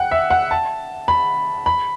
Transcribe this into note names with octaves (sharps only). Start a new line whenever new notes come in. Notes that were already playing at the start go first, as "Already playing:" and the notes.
Already playing: F#5 G5
E5
F#5
A5
B5
B5